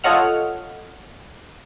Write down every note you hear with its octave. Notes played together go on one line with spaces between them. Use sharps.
F4 A4 C#5 D#5 F#5 F6